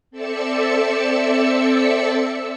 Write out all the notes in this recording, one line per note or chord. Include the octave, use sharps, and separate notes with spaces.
C4 A4 D5 E5 E6 C#7